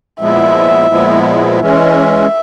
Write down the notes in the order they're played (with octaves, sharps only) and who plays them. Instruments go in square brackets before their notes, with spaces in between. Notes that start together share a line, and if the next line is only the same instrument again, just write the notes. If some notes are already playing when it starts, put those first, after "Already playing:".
[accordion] A#2 F3 G#3 B3 E4 [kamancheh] E5
[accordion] A#2 F3 G#3 B3 E4
[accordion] E3 G#3 C#4 [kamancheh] E5